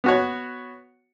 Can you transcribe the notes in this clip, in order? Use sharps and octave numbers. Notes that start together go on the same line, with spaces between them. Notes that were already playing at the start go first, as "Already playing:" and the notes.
B3 F#4 C#5